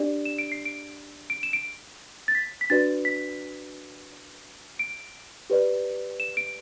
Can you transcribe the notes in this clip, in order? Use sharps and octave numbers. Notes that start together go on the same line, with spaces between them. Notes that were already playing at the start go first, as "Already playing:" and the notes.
Already playing: D4 G4 D5
E7
D7
C7
D7
D7
E7
D7
A6
B6
B6
D4 F#4 B4 D5 A6
B6
D7
G4 B4 D5
E7
D7